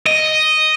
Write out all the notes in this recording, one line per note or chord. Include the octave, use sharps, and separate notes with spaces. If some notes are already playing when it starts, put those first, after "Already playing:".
D#5